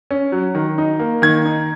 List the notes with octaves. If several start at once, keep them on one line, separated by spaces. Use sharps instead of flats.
C#4
F#3
D#3
D#4
A#3
D#3 G#6
D#4